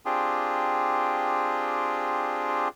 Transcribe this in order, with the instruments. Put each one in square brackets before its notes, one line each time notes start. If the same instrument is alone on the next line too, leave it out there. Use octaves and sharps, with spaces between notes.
[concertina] C4 D4 F4 G4 G#4